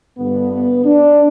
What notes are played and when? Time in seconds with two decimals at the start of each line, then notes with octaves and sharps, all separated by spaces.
0.17 G1 G2 D3 B3
0.51 B3
0.85 D4